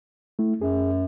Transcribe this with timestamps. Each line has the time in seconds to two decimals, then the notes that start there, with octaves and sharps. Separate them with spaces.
0.39 A3 E4
0.61 F#2 G#4